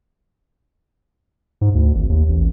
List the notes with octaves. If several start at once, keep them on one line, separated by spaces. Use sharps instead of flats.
G#2
D2
G#1
D#2
A1